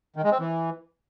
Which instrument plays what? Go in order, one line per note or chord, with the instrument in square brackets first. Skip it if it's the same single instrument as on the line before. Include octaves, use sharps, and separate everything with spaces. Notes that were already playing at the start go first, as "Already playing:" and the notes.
[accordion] D#3
G#3
C4
E3